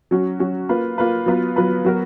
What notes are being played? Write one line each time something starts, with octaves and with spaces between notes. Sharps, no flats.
F#3 C#4 F#4
F#3 C#4 F#4
A#3 F4 B4
A#3 F4 B4
F#3 B3 F4 B4
F#3 B3 F4 B4
F#3 B3 F#4 A#4